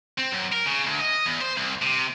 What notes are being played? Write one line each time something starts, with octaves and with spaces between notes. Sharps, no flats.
C4
F#2
A#4
C#3
D2
D#5
E2
C5
C2
C3